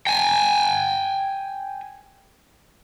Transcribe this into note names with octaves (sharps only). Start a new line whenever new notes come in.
G5 G#5